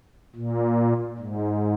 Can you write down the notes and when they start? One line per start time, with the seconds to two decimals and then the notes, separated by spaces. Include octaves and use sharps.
0.36 A#2
1.18 G#2